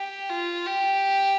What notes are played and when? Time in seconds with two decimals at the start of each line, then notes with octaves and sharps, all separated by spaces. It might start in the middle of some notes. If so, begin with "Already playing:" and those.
Already playing: G4
0.30 F4
0.66 G4